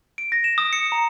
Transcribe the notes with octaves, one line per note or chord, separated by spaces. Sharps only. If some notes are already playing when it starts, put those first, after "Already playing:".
D7
A#6
E7
D#6
C#7
A#5